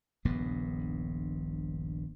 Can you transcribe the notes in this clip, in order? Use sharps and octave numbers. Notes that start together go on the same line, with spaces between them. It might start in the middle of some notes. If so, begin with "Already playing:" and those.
D#1 A#1 G2 B3